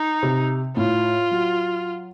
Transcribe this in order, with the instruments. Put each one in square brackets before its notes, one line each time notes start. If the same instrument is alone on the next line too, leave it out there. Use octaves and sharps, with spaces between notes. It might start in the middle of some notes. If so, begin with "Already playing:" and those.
Already playing: [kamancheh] D#4
[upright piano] C3
[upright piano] A2 [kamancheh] F4
[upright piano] F#3